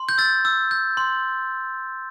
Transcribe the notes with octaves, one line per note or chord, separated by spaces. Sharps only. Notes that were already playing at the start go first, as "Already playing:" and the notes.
Already playing: C6
G6
E6 A6
E6
G6
C6